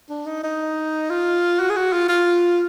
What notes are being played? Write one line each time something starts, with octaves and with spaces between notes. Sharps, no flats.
D4
D#4
D#4
F4
F#4
G#4
F#4
F4
F4